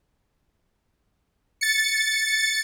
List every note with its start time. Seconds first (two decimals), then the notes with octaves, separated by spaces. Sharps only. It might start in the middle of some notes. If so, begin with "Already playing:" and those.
1.61 A6 C#7